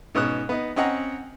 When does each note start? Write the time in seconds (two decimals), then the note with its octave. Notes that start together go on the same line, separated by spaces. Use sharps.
0.15 G#2 B2 C#4 D#6 F#6
0.49 B3 D#4
0.76 C4 C#4 D#5 F#5 A#5